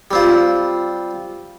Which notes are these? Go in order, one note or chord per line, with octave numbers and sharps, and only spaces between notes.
G3 C4 F4